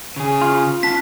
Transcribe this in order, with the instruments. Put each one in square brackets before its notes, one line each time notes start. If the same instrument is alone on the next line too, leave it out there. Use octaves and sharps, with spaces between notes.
[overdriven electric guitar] C#3 G#4
[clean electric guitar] F4
[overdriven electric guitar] C#4 A5 [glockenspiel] B6